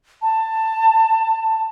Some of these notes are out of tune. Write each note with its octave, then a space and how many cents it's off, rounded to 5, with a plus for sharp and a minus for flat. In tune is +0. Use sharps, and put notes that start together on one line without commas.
A5 +15